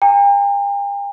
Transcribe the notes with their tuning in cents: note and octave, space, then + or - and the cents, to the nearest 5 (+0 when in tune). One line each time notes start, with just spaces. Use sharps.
G5 +45 A#5 -45